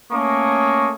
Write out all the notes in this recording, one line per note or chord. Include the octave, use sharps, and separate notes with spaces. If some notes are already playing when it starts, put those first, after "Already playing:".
A3 A#3 C#4 A#5 C#6 D#6